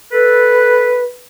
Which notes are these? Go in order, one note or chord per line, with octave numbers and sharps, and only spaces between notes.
A4 B4